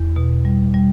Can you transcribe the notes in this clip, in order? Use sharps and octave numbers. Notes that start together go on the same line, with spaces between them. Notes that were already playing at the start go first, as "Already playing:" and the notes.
Already playing: E2
B2
G3
G3